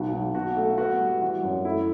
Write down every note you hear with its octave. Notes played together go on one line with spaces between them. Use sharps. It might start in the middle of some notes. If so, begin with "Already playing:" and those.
Already playing: B1 F#4
B1
B2 F#4
A3
B3 F#4
G3
E3 F#4
F#2
A3 E4